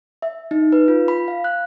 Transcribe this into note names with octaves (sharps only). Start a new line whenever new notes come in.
E5
D#4
B4
F4
B5
F5
F#6